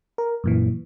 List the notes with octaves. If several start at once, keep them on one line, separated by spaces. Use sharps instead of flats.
A#4
F#2 A#2 E3